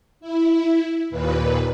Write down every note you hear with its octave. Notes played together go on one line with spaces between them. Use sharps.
E4
D#2 A#2 B4